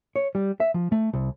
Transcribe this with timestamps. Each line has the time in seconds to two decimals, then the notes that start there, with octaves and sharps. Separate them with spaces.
0.16 C#5
0.35 G3
0.60 E5
0.74 F3
0.92 A3
1.13 C2